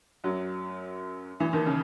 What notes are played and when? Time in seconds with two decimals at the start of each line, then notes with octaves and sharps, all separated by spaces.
0.24 F#2 F#3
1.40 E2 E3
1.53 D#2 D#3
1.66 C#3